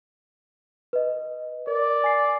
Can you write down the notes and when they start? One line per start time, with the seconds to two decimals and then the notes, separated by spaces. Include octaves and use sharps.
0.93 B4 D#5
1.67 A#4 D5
2.04 G#5 C7